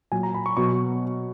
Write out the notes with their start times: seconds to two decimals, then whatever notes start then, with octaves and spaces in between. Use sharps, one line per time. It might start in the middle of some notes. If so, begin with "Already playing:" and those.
0.12 A#2 F#3 G#5
0.23 A#5
0.34 B5
0.46 C#6
0.57 B2 F#3 C#6